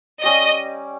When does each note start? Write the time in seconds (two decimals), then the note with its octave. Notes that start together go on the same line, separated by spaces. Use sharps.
0.23 G3 C#4 G4 D#5